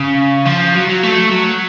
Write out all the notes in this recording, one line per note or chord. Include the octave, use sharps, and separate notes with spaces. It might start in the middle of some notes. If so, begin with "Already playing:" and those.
Already playing: C#3
F3
F#3
F#3
A3
F#3